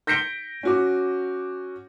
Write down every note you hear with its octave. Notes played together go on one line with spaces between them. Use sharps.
G6 A#6 B6 C#7 D7 G7
C#4 F#4 D6